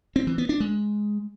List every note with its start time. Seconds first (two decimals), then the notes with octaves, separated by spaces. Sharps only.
0.16 C4
0.27 E3
0.38 B3
0.49 D4
0.60 G#3